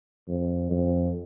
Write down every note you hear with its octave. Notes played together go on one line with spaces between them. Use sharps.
F2
F2